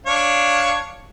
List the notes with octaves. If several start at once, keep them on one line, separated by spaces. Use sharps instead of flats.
D4 C#5 F5